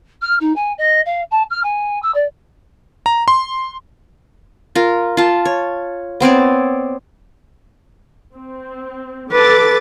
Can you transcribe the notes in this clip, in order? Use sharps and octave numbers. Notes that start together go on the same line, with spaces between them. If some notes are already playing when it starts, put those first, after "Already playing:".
F6
D#4
G#5
D#5
F5
A5
F6
G#5
E6
D5
A#5
C6
F4 A#4
F4 A5
C#5
B3 C4 C#5 D5
C4
A4 B4 D6 A6